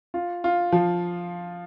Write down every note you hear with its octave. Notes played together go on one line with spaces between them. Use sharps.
F4
F4
F3